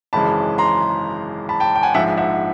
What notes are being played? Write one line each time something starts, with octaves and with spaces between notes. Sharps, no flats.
G#1 F#2 C#3 E3 G#3 A5 B5
A#5 C6
A5 B5
G5 A5
G5
F#5 G#5
A#1 G#2 F3 G#3 E5 F#5
E5 F#5